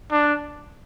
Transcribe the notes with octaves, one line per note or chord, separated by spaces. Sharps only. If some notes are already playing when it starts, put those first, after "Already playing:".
D4